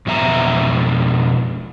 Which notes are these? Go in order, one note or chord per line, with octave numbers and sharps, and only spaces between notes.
F2 B2 E5 A#5